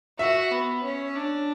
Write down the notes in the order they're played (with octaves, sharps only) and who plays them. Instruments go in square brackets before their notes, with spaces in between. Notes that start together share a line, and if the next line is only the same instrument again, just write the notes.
[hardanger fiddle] F#4 [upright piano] E5
[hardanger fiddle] B3
C#4
D4